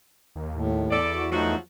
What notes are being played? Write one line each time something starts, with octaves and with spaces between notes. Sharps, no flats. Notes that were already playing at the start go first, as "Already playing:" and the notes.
D#2
A2
E2 E4 A4 D5
F#4
F3 F#3 A3 D#4 F#4